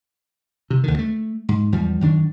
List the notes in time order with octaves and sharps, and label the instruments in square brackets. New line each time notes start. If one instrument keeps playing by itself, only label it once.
[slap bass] C3
D2 D3 D#3
A3
G#2
E2 F3 G3
F#2 D#3 D4